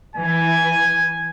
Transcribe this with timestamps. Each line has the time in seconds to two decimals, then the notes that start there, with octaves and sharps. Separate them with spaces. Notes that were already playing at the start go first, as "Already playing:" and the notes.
0.16 E3 G#5